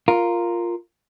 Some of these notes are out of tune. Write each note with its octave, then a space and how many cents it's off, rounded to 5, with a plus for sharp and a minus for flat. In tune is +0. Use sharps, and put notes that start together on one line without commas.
F4 +0 A#4 +0